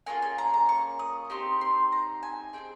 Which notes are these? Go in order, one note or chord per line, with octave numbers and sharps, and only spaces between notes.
A#3 C#4 F4 G#4 G#5
G#5
A#5
A#5
C#6
D#6
C4 D#4 G4 C6
C6
A#5
G#5
C4 D#4 G#4 G5